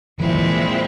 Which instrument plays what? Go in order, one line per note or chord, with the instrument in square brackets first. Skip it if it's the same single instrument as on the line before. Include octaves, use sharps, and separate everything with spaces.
[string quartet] A#2 F3 G#3 C4 E4 [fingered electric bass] E3
[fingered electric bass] E3